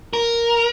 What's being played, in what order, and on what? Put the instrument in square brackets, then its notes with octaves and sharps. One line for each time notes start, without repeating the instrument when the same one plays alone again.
[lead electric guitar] A#4